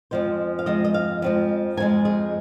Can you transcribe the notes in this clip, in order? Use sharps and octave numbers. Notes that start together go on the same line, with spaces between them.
F2 F3 G#3 C5
F5
F2 F3 G#3 D#5
D#5
F5
F2 F3 G#3
F2 F3 G#3 G#5
G#4